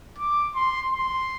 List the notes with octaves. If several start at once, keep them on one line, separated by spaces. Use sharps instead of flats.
D6
C6
C6